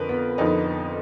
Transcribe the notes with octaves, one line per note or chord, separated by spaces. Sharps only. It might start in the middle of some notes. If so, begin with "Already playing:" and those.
Already playing: F2 D3 F3 A#4 B4
B3
F2 D3 F3 D#4